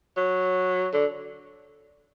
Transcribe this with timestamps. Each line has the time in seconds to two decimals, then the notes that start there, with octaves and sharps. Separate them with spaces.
0.16 F#3
0.94 D3